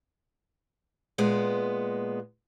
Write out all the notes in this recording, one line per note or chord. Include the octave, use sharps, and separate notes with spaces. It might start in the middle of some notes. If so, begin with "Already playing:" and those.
A#2 G#3 B3